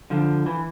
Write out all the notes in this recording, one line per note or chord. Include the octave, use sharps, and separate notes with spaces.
D3 F3
E3